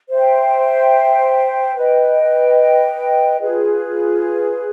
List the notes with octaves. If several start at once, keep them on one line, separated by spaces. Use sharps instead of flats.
C5 E5 G5
B4 D#5 G5
F4 G#4 B4